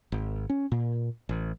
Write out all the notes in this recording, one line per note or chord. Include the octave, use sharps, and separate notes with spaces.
G#1
C#4
A#2
A1